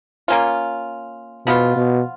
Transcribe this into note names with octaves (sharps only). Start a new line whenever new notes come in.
A#3 C#4 F4
B2 F3 B3 F4
B2